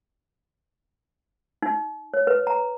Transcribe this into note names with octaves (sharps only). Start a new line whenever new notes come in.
D#4
C#5
B4
A#5